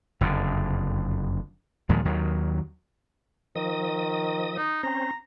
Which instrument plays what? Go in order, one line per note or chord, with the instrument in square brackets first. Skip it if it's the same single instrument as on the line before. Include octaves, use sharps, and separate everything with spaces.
[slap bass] F#1 F2 D3
D#2 A#2 F3 G#3
D#2 D#3 F#3
[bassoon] D#3 [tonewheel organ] F3 D#5 D#6
[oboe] D#4
[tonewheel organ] C4 C#4 C5 [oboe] A#5